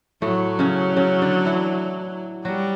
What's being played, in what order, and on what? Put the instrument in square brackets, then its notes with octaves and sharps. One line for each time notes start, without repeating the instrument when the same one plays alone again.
[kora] A2 A3 [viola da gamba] F#3
[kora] C#3 C#4
C#3 C#4
D3 D4
E3 E4
[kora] F#3 F#4 [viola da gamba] G3